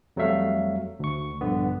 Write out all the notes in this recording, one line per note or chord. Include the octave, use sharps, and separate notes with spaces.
F2 F#3 G3 A3 E5 F5
D2 C#6
A#1 G2 D3 B3